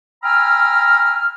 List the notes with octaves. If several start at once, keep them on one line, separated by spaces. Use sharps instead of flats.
G5 G#5 A#5 B5 E6 F6